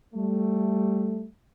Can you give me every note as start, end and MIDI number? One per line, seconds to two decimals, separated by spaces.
0.15 1.25 55
0.15 1.25 57